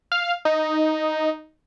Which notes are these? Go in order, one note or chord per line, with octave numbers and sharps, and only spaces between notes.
F5
D#4